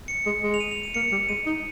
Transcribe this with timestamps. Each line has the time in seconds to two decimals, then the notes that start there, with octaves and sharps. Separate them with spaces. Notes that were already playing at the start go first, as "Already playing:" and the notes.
0.08 C#7
0.26 G#3
0.43 G#3
0.54 F7
0.60 D#7
0.71 F7
0.83 D#7
0.94 A#3 C#7
1.12 G3
1.29 G#3 D#7
1.46 D#4